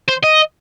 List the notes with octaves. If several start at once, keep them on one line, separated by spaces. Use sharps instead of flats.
C5
D#5